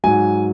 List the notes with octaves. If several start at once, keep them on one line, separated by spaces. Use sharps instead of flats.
G#2 F#3 G#5